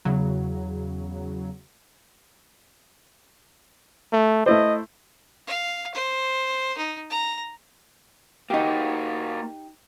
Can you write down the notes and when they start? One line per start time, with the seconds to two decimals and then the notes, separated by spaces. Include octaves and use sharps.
0.05 E2 C#3 F#3
4.13 A3
4.46 A3 E4 C5 D#5
5.47 F5
5.94 C5
6.77 D#4
7.10 A#5
8.50 A#3 D#4 F#4 G4